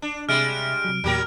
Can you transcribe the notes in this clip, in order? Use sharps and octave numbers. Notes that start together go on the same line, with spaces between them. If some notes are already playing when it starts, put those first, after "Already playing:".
D4
C3 G3 G#3 E5 F6 A6 D7
C3 F#3
E2 A#2 F#3 G4 A#4